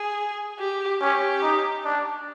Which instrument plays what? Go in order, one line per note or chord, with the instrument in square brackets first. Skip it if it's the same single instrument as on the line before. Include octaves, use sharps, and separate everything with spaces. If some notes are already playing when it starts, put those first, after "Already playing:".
Already playing: [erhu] G#4
G4
[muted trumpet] C#4 [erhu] G4
[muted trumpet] D#4
D4